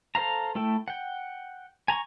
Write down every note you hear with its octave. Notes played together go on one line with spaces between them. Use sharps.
A4 C5 F5 A#5
A3 E4 A4 G5
F#5 G5
G#5 A#5 B5 C#6